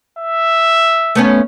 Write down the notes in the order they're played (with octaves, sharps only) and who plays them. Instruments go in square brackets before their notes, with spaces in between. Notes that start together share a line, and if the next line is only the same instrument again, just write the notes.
[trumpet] E5
[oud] A3 B3 C#4